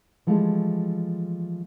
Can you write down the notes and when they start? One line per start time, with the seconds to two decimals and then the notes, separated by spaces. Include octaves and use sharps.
0.27 E3 F3 G#3 A3 G4